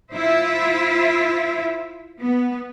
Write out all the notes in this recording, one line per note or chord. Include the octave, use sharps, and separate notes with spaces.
E4 F4 C5 E5
B3